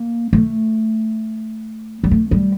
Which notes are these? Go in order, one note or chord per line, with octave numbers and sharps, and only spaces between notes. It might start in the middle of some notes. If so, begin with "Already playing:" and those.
Already playing: A#3
A3
G3
A3
G3